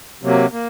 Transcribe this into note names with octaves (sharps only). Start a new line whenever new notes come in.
C3 F#3 A#3
A#3